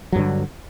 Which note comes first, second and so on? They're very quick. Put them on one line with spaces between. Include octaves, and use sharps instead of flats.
F#3 G2 D3